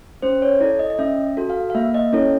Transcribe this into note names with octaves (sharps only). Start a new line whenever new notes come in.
C#4 C5
C#5
E4 A4 D5
D#5
D#5
C#4 E5
F#4 A4
F5
F5
A#3 E5
D#5
C#4 E4 A4 C#5